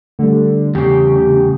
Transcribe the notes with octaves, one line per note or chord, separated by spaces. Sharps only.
D3 G3 A3
E2 C#3 G4